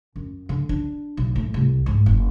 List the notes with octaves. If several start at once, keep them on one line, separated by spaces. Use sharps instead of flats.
F#2
D3
D4
B1
A2
C2
G#2
F#1